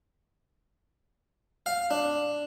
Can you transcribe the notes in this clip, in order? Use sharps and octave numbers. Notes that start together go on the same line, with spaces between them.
F5
D4